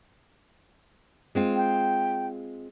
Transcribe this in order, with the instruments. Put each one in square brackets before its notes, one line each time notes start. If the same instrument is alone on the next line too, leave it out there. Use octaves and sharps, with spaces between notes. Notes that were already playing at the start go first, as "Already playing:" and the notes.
[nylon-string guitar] G#3 C4 F4
[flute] G5